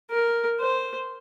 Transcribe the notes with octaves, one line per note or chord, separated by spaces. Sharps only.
A#4
C5